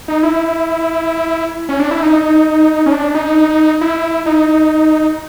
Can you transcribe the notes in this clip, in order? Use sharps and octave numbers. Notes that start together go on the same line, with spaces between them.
D#4
E4
C#4
D4
E4
D#4
C#4
D4
D#4
E4
D#4